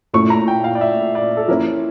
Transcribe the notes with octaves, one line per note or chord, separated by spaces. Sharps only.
A#2 A3 C#4 E4 C#6
A#5
G5
F5
D5
E5
D5
A4
F3 A#3 C#4 E4 A#4